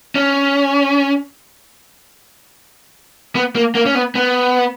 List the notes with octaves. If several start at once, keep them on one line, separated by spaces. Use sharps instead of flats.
C#4
B3
A#3
A#3
C#4
B3
B3